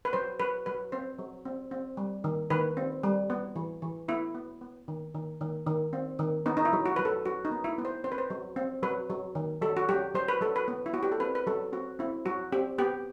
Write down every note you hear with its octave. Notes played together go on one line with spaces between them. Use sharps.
B4
F#3 C5
F#3 B4
F#3 B4
C4 C5
F#3
C4
C4
G3
D#3
D#3 B4
C4
G3
B3
E3
E3
B3 E4
B3
B3
D#3
D#3
D#3
D#3
C4
D#3
B3 D#4
D#4
E4
F#3
F#4
F#3 B4
A4
F#3 F#4
D#4
B3
E4
B3
C5
C4 C5
B4
C5
F#3
C4
F#3 B4
F#3
D#3
F#3 A4
F#4
F#3 G4
F#3 C5
B4
F#3 A4
B4
B3
E4
B3 F#4
G4
A4
C4 B4
B4
F#3 A4
C4 F#4
C4 E4
F#3 F#4
C4 G4
B3 G4